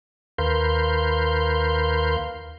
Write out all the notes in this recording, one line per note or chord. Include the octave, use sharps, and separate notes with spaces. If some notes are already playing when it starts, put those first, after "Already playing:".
D#2 A#4 B4 F5 C6 G6